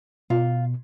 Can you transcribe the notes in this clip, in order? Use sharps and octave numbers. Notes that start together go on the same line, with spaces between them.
B2 F4